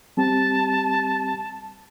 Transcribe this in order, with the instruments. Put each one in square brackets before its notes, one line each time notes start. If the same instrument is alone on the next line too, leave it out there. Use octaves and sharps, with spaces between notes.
[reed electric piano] G3 C4 G4 [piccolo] A5